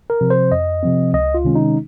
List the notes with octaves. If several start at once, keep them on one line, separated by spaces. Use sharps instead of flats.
A#4
C3 F3 C4
C5
F2 D#5
C3 F3 C4
C#2 D#5
F4
C3 D#3 G#3 C#4
D#4